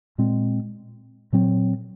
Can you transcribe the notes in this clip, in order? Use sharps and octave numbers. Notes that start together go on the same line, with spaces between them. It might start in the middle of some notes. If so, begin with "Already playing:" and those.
A#2 G#3 C4
A#2 F#3 C4